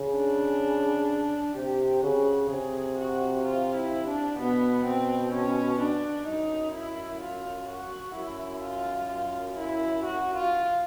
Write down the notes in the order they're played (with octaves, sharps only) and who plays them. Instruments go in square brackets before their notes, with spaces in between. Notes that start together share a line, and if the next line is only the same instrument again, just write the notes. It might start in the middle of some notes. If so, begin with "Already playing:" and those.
Already playing: [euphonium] C#3
[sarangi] D4
[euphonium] C3 [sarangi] G4
[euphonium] C#3 [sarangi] F#4
[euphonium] C3 [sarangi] G#4
[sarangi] F#4
F4
E4
D4
[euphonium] B2 [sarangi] B3
[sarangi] C4
C#4
D4
[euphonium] F#2 [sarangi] D#4
[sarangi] E4
F4
F#4
[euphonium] F#2 [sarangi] E4
[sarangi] F4
F4
E4
F#4
F4